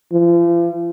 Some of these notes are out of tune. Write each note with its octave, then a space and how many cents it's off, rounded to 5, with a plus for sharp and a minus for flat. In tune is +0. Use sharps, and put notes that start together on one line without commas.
F3 -40